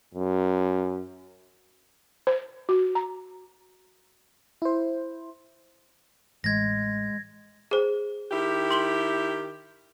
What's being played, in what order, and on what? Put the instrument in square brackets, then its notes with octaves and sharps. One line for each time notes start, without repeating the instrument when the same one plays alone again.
[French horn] F#2
[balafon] C5
F#4
A#5
[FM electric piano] E4 C5
[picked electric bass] A1 [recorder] G#3 [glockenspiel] G#6 A#6
[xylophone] G#4 C5
[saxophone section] D#3 E4 G4
[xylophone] C6 F#7 G7